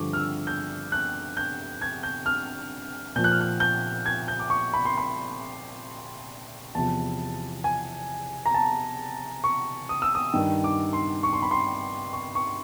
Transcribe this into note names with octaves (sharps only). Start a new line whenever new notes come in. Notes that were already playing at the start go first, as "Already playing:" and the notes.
Already playing: G2 D3 F3 C#6 D6
F6
E6
G6
F#6
G6
G#6
G6
F6
A#2 F3 G6
F#6
F6
F#6
G6
G#6
G6
D6
C#6
B5
C6
B5
E2 C3 F3 A5
G#5
A#5
A5
C#6
D#6
E6
D#6
G2 D#3
D6
C6
C#6
C6
B5
C6
C#6
C#6